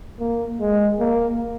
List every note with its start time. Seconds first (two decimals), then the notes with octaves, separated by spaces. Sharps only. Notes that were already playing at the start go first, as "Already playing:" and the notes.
0.20 A#3
0.60 G#3
1.00 A#3